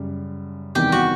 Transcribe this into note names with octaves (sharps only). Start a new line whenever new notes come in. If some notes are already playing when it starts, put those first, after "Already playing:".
Already playing: F#2 C#3 G3
E2 C3 D#3 G3 G4
F#4